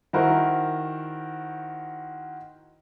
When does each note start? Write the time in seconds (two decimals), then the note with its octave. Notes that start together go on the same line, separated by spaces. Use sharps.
0.13 D#3 E4 F#4 A#4 C5